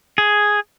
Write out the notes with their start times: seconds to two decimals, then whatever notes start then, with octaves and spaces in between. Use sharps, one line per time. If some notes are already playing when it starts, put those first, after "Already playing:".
0.18 G#4